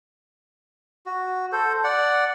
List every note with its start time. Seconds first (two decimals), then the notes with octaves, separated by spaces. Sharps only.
1.06 F#4
1.52 A4 C5
1.84 D5 F#5